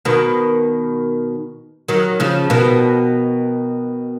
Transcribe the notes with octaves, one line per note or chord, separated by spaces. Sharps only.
B2 D#3
D#3 F#3
C#3 F3
B2 D#3